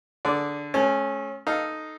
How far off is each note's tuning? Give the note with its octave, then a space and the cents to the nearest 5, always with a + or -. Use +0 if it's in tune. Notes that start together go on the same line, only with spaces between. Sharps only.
D3 +0 G#4 +15 D5 -15
A3 -45 C#4 -15
D#4 +0 A4 +0 F5 +0